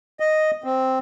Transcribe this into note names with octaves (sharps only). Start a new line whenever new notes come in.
D#5
C4